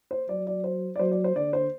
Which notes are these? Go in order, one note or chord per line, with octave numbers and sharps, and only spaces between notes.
C5
F#3 D5
D5
C5
D5
F#3 C5
D5
C5
D3 D5
C5